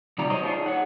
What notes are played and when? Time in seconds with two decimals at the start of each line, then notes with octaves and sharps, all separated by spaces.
0.18 C3 G3 D#4 F4 D5 A#5
0.30 F#3 C5 C#5 D#5
0.43 D4 D#4 F4 G#4
0.66 G#4 C#5 F#5